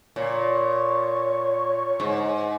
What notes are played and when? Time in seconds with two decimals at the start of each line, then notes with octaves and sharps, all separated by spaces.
0.16 A#2 C#5
2.00 G#2